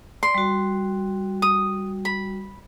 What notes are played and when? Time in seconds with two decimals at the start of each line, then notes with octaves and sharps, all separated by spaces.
0.23 D5 C6
0.35 G3 F#4
1.42 D#6
2.05 B5